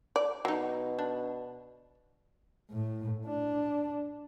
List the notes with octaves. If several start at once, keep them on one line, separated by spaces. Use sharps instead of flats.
D5
B2 F#3 D#4
D4
A2
D4